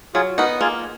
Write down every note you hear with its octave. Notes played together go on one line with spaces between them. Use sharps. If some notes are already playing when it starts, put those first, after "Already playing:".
F#3 F4 G#4
B3 D#4 F#4 A#4
A#3 F4 G#4